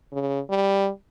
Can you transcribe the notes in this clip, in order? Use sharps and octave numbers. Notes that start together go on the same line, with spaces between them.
C#3
G3